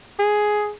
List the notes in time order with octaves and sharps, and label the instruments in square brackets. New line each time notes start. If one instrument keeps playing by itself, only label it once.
[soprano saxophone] G#4